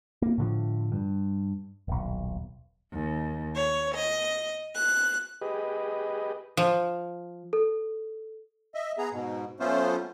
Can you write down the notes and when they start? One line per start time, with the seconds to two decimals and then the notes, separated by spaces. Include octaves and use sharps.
0.22 A#3
0.38 A2 D3 F3
0.92 G2
1.88 D#1 B1
2.93 D#2
3.56 C#5
3.94 D#5
4.75 F#6
5.41 G4 G#4 B4 D#5
6.57 F3
7.53 A4
8.75 D#5 E5
8.98 B3 G#4 A#5
9.13 G#2 B2
9.60 F#3 A3 B3 C#4 F4 C5